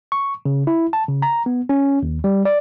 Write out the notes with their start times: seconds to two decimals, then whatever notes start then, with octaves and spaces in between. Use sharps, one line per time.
0.12 C#6
0.45 C#3
0.67 E4
0.93 A5
1.08 C#3
1.22 A#5
1.46 B3
1.69 C#4
2.03 D#2
2.24 G3
2.45 D5